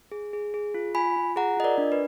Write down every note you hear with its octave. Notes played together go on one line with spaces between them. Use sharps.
G#4
G#4
G#4
F4
F4 G#5 B5
F4
G#4 F#5 A#5
F4 D#5
A#4 D5
D4
B4